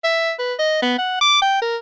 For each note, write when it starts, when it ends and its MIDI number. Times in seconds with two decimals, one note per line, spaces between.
0.04 0.33 76
0.39 0.54 71
0.59 0.80 75
0.82 0.95 59
0.98 1.19 78
1.21 1.42 86
1.42 1.58 79
1.62 1.77 70